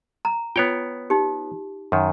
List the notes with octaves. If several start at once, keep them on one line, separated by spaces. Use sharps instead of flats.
A#5
B3 F4 C#5 G5
D#4 G4
F#2 D#3